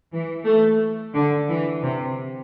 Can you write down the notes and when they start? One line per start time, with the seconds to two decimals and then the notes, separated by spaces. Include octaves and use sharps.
0.13 E3
0.46 A3
1.14 D3
1.49 E3
1.82 C3